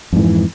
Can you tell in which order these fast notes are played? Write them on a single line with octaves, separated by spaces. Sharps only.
F2 G#2 E3